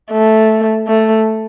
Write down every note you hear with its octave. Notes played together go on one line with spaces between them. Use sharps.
A3
A3